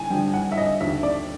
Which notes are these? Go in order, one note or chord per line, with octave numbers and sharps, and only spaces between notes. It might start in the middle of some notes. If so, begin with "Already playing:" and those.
Already playing: G2 D3 G#5
G2 D3 F3 G5
F#5
E5
D#5
D#2 D3 F3 E5
D5